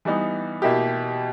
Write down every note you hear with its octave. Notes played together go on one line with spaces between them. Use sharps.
E3 G3 B3 D#4
B2 A#3 E4 G4